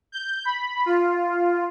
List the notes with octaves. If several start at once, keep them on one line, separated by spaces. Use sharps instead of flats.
G6
B5
F4